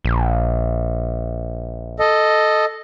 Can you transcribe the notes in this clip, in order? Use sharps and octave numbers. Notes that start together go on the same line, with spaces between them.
A#1
A4 D#5